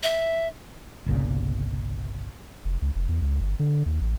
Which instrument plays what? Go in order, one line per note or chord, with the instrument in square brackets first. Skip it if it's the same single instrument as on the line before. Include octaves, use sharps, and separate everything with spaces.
[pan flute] E5
[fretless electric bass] G1 C2 A#2 C#3
[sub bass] F1
C#2
F1
E2
C#2
G1
D3
D#2
A1